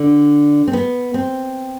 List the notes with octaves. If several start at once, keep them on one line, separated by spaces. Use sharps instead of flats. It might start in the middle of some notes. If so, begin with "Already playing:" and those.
Already playing: D3
C4
B3
C4